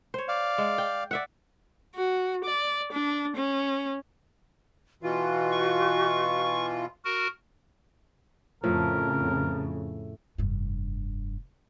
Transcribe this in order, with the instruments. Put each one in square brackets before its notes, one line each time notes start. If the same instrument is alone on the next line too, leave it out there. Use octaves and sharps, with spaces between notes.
[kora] C5 C#5
[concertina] D5 F5
[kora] G#3
G5
D5 E5 F#5
[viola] F#4
D5
D4
C#4
[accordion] B2 E3 F4 [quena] F#4
[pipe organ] C#6
F#4 A#4
[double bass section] F2 C#3 [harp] A2 [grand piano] F3 [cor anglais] A#4
[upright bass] F1 G2